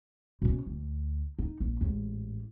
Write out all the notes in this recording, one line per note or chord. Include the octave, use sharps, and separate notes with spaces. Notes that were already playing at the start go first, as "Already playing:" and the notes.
B2 C#4
D2
D#4
A#1
A1 G#2